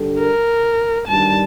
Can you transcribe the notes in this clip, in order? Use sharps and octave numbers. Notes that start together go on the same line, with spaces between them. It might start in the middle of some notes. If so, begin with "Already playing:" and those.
Already playing: G2 D3 G3 D4 A4
A#4
G2 D#3 G3 D4 A5